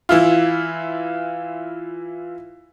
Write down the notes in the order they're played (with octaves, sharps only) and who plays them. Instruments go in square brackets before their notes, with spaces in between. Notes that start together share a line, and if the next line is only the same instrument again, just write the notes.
[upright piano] E3 E4 F4